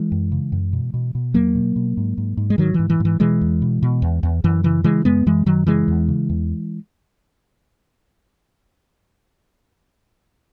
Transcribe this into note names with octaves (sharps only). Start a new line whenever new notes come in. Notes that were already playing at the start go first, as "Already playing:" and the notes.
Already playing: E3 G#3
F#2
C#3
F#2
B2
B2
B2
E2 F#3 A#3
B2
B2
G#2
G#2
G#2
G#3
G#2 D#3 F#3
G#2 E3
E3
G#2 E3
B2 E3 G#3
E2
B2
B2
E2
E2
F#2 E3
C#3 E3
C#3 E3 G#3
F#2 G#3 B3
F#2 E3 G#3
F#2 D#3 F#3
C#3 E3 G#3
E2
C#3
E2